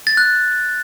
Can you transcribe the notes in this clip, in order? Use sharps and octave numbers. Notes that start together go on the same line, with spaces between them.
A6
F#6